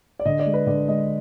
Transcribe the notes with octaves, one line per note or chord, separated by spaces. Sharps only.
D5
D3 D#5
D5
G#3
B4
D3 D5
G#3 D#5